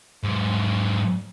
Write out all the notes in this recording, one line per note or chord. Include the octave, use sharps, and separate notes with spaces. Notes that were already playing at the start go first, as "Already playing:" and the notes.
G#2 F#3